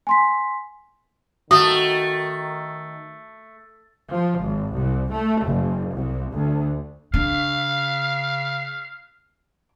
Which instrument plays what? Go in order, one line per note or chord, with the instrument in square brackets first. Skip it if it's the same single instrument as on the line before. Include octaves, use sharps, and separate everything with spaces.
[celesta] G#5 C6 B6
[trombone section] D#3 [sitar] A3 [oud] F#4 [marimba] D#6
[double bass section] F3
G#1
C2
A3
F#1
C2
D2
[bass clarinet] C#3 [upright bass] D4 [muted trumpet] F5